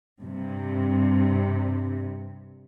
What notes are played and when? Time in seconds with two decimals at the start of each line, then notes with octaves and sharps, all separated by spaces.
0.21 G2 C3